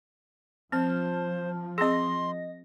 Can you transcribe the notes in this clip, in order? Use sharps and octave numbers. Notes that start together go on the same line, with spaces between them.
F3 C4 C5 A5 F6
C4 G#4 D#5 C6 A#6